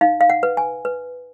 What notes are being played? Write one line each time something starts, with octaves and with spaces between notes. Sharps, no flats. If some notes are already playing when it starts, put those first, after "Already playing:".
D#4 F5
F5
F#5
B4
G#5
B4